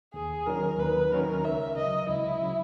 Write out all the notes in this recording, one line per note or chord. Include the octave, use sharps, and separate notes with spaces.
D#2 G#4
D#3 F#3 C#4 A#4
D#2 B4
D#3 F#3 C#4 A#4
C#2 E5
C#3 F#3 D#5
C#2 E4
C#3 F#3